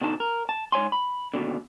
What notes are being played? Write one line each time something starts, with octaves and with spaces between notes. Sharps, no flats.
B2 D3 D#4 A5
A#4
A5
G#2 C#5 G#5 C6
B5
D#2 G#2 B2 D3